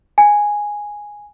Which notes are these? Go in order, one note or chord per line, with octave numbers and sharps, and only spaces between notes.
G#5